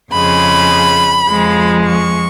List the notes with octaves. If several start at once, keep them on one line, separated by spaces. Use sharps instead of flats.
F2 C#3 G#3 B5
F2 F3 G#3
C#6